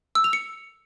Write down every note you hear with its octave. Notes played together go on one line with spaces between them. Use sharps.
E6
F7
C#7